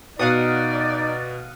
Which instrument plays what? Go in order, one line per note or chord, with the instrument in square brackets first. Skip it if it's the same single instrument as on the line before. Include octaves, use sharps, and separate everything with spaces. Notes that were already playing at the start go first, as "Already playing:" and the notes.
[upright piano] B2 [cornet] D#4 [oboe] D5 [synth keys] F5 F#5 D#6